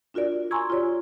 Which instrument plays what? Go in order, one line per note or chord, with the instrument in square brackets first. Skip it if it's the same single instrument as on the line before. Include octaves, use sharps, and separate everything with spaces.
[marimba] D4 F4 F#4 A#4 D5
G#5 A#5 C6 C#6 E6 G#6
F4 G4 C#5 D5